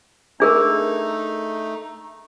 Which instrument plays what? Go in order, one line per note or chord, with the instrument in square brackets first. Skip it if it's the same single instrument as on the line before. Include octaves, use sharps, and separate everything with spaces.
[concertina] A3 D#4 [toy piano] D4 G#4 A#4